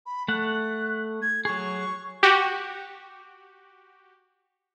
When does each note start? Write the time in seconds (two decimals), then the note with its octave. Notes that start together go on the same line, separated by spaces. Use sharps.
0.06 B5
0.28 A3 F#5 F#6
1.22 G#6
1.45 F#3 G#4 C#6
2.23 F#4 G4